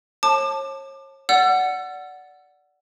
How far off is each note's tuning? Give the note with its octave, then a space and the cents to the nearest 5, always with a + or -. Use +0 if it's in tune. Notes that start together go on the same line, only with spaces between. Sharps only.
C#5 -40 A5 +0 D6 +30
D5 -10 F#5 +0 E6 +40